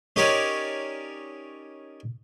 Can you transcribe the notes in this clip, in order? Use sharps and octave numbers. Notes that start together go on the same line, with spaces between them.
C#4 D#4 G4 A#4 C#5 D5